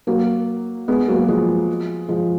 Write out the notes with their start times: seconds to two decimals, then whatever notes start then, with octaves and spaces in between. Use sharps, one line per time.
0.07 F#3 A#3
0.88 G#3 B3
1.08 F#3 A#3
1.28 F3 G#3
2.09 F3 G#3